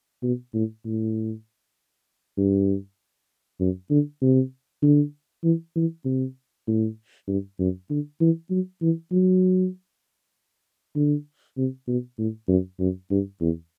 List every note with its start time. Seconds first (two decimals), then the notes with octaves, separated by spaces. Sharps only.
0.23 B2
0.54 A2
0.85 A2
2.38 G2
3.60 F#2
3.91 D3
4.22 C3
4.82 D3
5.44 E3
5.76 E3
6.05 C3
6.67 A2
7.28 G2
7.59 F#2
7.90 D3
8.21 E3
8.51 F#3
8.82 E3
9.12 F#3
10.96 D3
11.58 C3
11.88 B2
12.18 A2
12.48 F#2
12.80 F#2
13.11 G2
13.41 E2